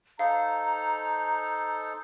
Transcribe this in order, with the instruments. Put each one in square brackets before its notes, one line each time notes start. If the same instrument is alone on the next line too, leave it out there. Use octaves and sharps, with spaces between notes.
[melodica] D#4 A4 C5 [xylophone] F5 [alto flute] A#5